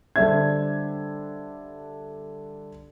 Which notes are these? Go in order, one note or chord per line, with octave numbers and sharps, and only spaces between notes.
D3 G3 D4 C5 E5 G#6